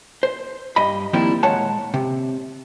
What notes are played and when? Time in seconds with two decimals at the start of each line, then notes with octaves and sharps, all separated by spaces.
0.23 C5
0.76 G2 D#5 B5
1.13 D#3 F3 G3 A#3 C4 E4
1.43 A#2 G#3 C#5 F#5 A5
1.94 C3